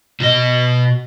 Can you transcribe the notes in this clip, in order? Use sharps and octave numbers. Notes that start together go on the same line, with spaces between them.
B2 D#5